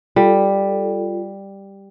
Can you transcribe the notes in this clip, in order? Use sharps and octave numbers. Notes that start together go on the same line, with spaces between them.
G3 F4 A4